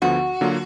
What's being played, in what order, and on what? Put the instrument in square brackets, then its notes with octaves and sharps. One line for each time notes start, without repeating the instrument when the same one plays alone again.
[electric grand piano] D2 D3 F3 B3 [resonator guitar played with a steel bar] F#4
[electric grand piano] D3 F#3 A#3 F4